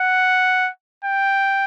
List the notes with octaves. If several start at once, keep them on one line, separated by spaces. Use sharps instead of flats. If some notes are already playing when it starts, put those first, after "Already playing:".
Already playing: F#5
G5